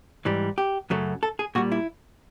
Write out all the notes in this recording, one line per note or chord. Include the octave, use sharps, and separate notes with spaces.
G#2 E3 G3
G4
F#2 C#3 F#3 A3
A4
G#4
A#2 G3 F#4
E4